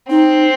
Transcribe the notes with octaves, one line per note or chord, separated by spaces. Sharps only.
C4 D#4